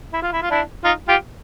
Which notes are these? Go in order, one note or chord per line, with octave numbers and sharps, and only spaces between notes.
E4
F4
E4
F4
D4 E4
D#4 F4
F4 G4